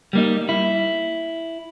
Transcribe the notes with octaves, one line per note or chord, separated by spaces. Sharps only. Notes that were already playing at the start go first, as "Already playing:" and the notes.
G3 A#3 D#4
E4